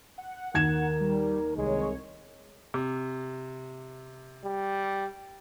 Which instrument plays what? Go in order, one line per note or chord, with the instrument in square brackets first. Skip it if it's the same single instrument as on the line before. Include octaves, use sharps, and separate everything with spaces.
[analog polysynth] F#5
[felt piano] D#2 G#6 E7 [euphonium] A#4
[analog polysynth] G3
[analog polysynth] C2 C#5 [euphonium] G#3
[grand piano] C3
[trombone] G3